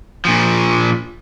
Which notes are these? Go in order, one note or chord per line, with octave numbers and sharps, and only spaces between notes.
A#2 F3